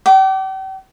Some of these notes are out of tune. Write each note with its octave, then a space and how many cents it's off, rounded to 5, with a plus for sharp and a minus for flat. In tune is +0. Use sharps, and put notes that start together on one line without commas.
G5 -40 D6 -10